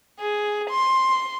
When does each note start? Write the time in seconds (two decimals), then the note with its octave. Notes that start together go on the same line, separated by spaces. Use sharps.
0.20 G#4
0.70 C6